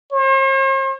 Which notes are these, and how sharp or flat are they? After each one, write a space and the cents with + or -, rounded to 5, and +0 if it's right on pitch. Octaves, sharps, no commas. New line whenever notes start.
C5 +45